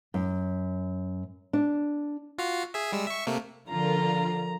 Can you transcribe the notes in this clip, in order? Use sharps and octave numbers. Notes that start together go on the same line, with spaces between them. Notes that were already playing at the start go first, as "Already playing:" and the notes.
F#2
D4
F4 F#4 F5
G#4 E5
G3 G#3 E6
E5 C#6
C3 A3 A#3
D3 F3 F4 A#4 A#5